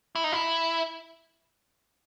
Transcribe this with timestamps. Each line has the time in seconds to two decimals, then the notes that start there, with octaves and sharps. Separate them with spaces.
0.15 E4
0.24 D#4
0.32 E4